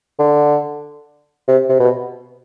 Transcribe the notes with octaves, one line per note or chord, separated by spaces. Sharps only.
D3
C3
C3
B2